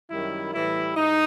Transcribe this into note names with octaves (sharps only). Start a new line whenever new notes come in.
F#2 D#3 G3 E4
A2 E3 G3 E4
G#2 D#4